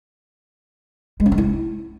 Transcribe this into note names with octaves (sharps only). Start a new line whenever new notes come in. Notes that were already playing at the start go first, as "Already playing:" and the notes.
G#3
C#4
G#3
E4